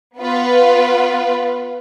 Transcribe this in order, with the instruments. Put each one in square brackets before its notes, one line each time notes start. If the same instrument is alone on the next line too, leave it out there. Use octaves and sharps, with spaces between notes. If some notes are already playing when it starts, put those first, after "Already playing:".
[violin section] B3 F4 B4